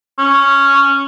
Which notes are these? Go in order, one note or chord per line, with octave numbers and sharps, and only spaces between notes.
C#4